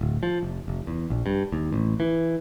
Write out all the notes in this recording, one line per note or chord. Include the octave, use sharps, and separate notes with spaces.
D1
F3
F1
F1
E2
A#1
G2
D#2
A1
E3